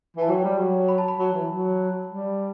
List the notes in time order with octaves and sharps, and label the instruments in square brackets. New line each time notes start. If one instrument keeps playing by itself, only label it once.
[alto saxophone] E3 [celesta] A5
[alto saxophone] F#3 [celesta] G5
[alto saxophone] G3
F#3
[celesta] B5
A5
B5
[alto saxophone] F#3
E3
F#3
G3